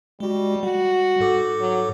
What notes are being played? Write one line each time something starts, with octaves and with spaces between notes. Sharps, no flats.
G3 G#3 F#4
G3 F#4
G#2 A4 D6
F#3